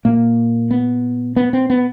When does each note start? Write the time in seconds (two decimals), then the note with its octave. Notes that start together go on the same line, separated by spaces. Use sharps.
0.05 A#2 A#3
0.71 B3
1.36 B3
1.53 C4
1.70 B3